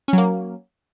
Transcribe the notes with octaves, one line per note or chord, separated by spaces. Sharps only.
F#3 A#3 C#4